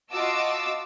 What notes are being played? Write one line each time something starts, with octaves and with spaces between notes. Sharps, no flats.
F4 F#4 D#5 A5 D6 E6